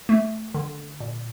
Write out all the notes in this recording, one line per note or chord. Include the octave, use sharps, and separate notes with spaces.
A3
D3
A#2